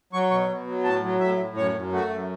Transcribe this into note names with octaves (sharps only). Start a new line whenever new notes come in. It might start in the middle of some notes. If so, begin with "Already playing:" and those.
F#3 C#6
B2 C#6
B2
F#3
A2 A5
F#3
A2 E5
A2
F#2 C#5
F#2
A3 F#4
F#2